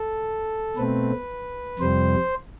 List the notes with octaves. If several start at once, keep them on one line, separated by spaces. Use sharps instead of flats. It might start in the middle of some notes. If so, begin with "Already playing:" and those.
Already playing: A4
B2 A3 C4 B4
F2 C3 G3 C5